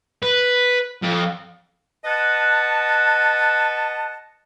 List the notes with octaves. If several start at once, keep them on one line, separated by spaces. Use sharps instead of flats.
B4
F2
B4 D#5 F#5 A5